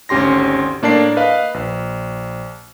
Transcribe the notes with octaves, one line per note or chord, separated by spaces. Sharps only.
G#1 D2 C#4 G4 C6 A#6
A2 A#3 D4 D5 A5 C7
B4 D#5 F5
A#1